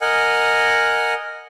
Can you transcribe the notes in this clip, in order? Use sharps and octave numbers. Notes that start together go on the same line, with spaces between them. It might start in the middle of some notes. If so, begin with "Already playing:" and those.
A#4 D#5 F#5 G#5